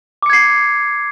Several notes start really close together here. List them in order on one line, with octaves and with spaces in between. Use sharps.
D6 C#7 G#6 C7